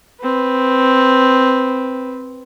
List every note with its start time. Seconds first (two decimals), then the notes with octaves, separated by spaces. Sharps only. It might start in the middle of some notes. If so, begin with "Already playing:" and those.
0.22 C4 B4